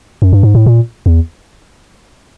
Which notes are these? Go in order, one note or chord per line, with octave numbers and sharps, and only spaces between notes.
F#2
G2
G#2
A2
A#2
E2